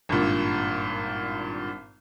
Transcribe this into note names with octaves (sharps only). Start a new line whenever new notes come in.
G#1 G2 A#2